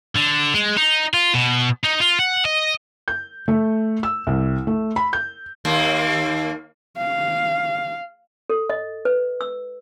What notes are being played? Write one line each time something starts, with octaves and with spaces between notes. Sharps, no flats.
D3
G#3
D#4
F4
B2
D#4
F4
F#5
D#5
G6
A3
E6
C2
A3
B5
G6
D#2 A#3
F5
A4
D#5
B4
E6